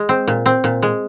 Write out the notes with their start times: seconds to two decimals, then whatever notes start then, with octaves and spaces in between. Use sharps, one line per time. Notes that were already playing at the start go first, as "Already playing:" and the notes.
Already playing: G#3
0.09 C4
0.28 A#2
0.46 C4
0.64 A#2
0.83 G#3